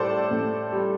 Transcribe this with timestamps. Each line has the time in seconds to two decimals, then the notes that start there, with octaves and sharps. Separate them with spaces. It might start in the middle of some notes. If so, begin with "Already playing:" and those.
Already playing: A2 G3 A4 C5 D5
0.31 A2
0.72 G3